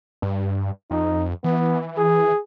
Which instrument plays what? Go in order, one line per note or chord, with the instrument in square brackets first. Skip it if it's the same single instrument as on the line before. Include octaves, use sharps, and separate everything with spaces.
[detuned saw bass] G2
[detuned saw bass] F2 [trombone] D#4
[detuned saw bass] E3 [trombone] B3
[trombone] G#4